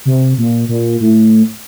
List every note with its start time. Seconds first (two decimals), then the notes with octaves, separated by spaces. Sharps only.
0.05 C3
0.38 A#2
0.69 A#2
1.00 A2